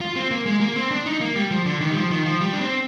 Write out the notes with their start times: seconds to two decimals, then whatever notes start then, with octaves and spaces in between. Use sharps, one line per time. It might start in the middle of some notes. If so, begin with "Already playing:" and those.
0.01 F4
0.16 C4
0.31 A#3
0.46 G#3
0.61 A#3
0.76 C4
0.91 D4
1.06 D#4
1.21 A#3
1.36 G3
1.51 F3
1.66 D3
1.81 D#3
1.91 G3
1.96 F3
2.11 D#3
2.26 F3
2.41 G3
2.53 D4
2.61 C4